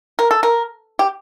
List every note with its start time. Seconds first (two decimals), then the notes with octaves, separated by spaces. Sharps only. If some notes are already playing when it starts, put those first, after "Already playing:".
0.19 A#4
0.31 A4
0.43 A#4
0.99 G4